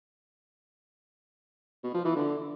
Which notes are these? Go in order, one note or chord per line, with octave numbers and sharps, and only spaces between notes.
B2
F3
E3
D3